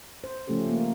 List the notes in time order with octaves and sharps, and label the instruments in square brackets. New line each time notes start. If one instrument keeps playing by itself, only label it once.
[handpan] C5
C#3 F3 A3 C#4 G4 A4
A#3